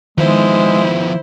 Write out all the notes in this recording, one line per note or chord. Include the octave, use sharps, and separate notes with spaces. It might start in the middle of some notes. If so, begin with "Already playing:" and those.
D#3 F3 G#3 B3 E4 C5